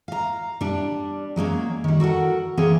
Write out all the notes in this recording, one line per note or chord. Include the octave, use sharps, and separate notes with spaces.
F5 A#5
G3 D4
F#3 G#3 A#3 C#4
D#3 G3
F#4 A4 A#4 F#5
E3 A#3 C4 C#4 G#4 C#5